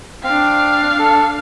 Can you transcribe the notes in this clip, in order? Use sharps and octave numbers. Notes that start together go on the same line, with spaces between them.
C4 D4 F5
A4